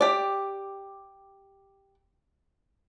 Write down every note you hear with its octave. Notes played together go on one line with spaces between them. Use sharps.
G4 D5